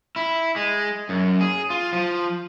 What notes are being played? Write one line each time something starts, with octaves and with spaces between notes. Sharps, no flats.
E4
G#3
F#2
G#4
F4
F3